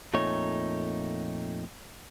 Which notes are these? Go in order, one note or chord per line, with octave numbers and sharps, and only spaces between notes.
F2 A#2 A3 D#4 C#5